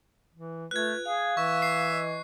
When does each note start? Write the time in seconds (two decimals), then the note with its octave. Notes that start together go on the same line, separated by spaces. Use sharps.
0.33 E3
0.71 A3 F4 B4 F#6 G#6
1.06 G#4 F5
1.37 E3 E5 C#6
1.62 C7
1.92 D#5